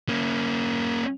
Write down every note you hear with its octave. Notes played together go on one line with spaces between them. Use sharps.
A#3 C#4